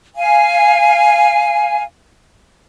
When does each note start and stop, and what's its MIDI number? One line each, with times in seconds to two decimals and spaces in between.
0.16 1.82 77
0.16 1.82 80